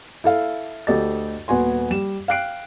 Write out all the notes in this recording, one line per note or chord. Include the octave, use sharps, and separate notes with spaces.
E4 A4 F5
D2 G4 A4 D#5 A6
D#1 B3 F#4 G#5 C6
G3 E7
F5 G5 F#6 C7 D7